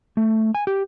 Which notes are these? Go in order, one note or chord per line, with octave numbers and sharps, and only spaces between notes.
A3
G#5
G4